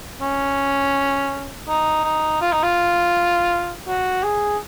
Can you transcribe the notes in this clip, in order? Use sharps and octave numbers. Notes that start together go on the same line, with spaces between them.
C#4
D#4
D#4
F4
D#4
F4
F#4
G#4